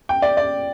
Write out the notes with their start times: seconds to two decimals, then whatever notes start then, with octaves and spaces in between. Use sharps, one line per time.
0.09 G5
0.22 D5
0.37 D5